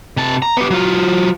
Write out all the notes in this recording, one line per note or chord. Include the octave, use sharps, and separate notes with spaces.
C3 A5
A#5
B3 G4
F#3 F4